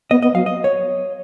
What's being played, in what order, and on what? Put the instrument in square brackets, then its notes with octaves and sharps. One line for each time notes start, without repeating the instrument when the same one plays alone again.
[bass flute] B3 [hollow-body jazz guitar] D#5
[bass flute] B3 [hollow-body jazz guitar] D#5
[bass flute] F#3 [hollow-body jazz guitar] F5
[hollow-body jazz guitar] D#5
C#5